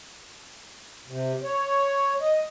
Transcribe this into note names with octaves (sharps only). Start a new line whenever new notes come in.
C3
C#5
D#5